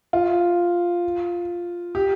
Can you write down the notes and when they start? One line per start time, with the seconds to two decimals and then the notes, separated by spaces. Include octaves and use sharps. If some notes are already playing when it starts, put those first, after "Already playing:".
0.13 F4
1.95 G4